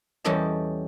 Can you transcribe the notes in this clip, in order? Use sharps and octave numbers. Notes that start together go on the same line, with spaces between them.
E2 G3 C#4 A4 D#5 A5